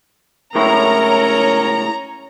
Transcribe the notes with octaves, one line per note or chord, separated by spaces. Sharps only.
C#2 A2 C#4 E4 A#4 C#5 A#5